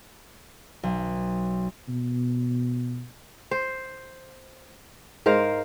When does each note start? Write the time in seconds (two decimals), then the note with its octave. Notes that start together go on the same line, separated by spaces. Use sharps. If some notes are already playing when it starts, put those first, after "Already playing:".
0.83 B1
1.88 B2
3.51 C5
5.26 G#2 A#4 C5 F5